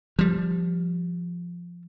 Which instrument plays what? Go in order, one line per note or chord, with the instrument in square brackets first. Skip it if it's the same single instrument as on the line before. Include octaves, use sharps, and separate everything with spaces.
[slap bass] F3 G3